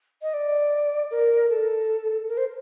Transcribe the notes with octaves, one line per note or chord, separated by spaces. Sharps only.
D#5
D5
A#4
A4
A#4
C5